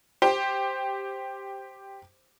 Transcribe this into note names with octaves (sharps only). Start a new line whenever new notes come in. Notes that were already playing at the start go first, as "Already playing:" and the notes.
G4 C5